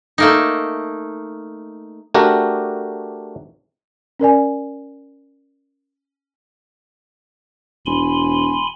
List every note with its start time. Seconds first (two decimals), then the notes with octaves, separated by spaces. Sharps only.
0.18 A3 A#3 D#4
2.14 A3 D4 F#4 G4 A#4
4.20 C#4 A#4 D5 G#5
7.86 E1 G#5 B5 C6